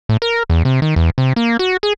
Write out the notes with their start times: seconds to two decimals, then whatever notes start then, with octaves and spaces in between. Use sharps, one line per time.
0.09 A2
0.22 A#4
0.50 E2
0.65 C3
0.82 D#3
0.96 E2
1.18 C3
1.36 A#3
1.59 F#4
1.83 G#4